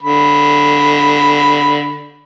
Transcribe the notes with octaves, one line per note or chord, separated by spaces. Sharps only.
D3 B5